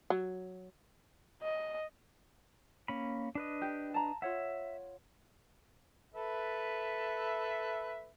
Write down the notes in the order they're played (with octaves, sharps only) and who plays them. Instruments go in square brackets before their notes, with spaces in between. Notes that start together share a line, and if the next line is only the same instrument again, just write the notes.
[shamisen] F#3
[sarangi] D#5
[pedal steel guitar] A#3 C#4 B5
D4 B4 D#5
[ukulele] G4
A5 A#5
[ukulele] F4 C#5 F#5 [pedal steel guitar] E5
[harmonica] A4 B4 E5